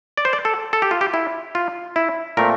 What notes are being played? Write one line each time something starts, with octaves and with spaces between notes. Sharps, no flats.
D5
C5
D5
A4
A4
G4
F4
G4
E4
F4
E4
A#2 A3 C4 A#4